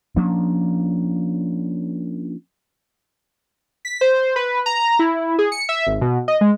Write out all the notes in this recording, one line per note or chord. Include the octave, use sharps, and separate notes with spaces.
F3 A#3 C#4 D4
B6
C5
B4
A#5
E4
G#4
C#7
E5
G#1
B2
D#5
G#3